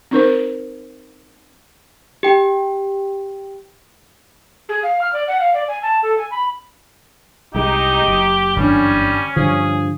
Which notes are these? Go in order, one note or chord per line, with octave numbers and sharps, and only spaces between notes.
C4 D#4 A#4 C5
G4 G5
G#4
F5
F6
D5
F#5
F5
D5
G#5
A5
A4
G#5
B5
C2 G#3 D#4 G4
F#1
G1 E3 G3 C#4 D4
G2 D3 F3 G#4